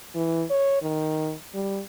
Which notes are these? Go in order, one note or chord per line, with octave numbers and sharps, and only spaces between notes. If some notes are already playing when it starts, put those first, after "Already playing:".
E3
C#5
D#3
G3